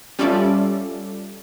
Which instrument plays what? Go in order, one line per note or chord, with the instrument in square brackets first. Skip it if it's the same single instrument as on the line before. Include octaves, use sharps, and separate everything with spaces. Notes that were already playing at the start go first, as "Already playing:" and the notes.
[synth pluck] G3 C#4 F4 A4 D5 E5